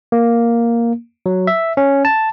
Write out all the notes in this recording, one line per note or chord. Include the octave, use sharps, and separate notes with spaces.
A#3
F#3
E5
C#4
A5